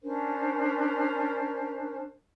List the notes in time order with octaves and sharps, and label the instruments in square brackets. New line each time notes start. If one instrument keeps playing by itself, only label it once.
[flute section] C#4 D4 A#4 C5